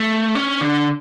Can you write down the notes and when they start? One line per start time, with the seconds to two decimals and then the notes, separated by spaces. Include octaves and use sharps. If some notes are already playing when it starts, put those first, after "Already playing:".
Already playing: A3
0.35 C#4
0.61 D3